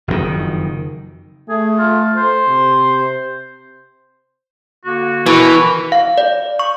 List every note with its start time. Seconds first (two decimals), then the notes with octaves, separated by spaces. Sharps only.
0.08 F#1 F2 A2 D#3
1.49 A3 G#4
1.78 F4
2.16 C5
2.47 C3
4.85 D3 A#3 F#4
5.26 B2 E3 A#4 B4 C#6
5.92 F5
6.18 D5
6.59 C#6